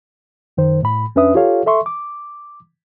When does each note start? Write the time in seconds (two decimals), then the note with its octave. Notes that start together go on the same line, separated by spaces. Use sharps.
0.57 F#2 D#3 C5
0.83 A2 B5
1.16 F2 C#4 D4 B4 E5 D#6
1.35 F4 G4 A4 C#5 F5
1.66 A4 E5 C6 C#6
1.86 D6